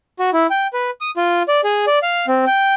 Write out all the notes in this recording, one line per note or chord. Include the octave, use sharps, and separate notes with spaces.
F#4
E4
G5
B4
D#6
F4
D5
G#4
D5
F5
C4
G5